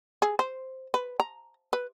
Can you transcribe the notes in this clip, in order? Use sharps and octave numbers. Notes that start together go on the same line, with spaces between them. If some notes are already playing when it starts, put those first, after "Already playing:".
G#4
C5
B4
A#5
B4